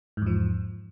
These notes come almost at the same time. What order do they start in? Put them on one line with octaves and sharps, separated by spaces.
G#2 E2 F3